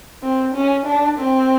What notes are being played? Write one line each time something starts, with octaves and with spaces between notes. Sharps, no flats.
C4
C#4
D4
C4